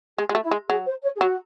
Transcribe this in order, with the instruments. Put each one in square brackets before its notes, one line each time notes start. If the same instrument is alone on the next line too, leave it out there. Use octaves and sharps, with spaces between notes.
[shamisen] G#3 [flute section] G#4
[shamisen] G#3 [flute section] F#4
[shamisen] A3
[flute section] E4
[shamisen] G#3
[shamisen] F#3 [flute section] G#4
[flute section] C5
C#5
G#4
[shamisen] F#3 [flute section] F#4